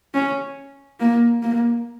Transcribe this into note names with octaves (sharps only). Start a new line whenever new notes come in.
C#4
A#3
A#3